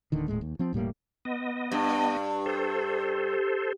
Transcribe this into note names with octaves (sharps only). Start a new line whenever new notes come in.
D1 D3 D#3
D#1 A2 G#3
D#2
F3 C4
E1 A2 G3 A#3
B3 D#5
G2
A4 C5